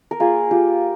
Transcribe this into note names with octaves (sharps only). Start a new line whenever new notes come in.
A#4
A#3 F4 G#4
F4 G4